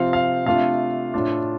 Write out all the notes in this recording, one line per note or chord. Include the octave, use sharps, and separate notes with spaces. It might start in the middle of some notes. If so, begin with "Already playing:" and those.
Already playing: C3 F3 C4 F4 F5
F5
C3 A3 D4 F4 F5
A2 A3 D4 F4